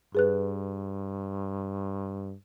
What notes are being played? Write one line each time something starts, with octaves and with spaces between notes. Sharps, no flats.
G2 G#4 B4 F#6